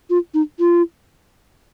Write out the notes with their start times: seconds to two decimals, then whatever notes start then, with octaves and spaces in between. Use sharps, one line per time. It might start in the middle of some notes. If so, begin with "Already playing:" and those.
0.10 F4
0.34 D#4
0.59 F4